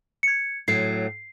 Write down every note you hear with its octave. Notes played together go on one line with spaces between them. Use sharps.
G#6 C#7
A2 F#3 C7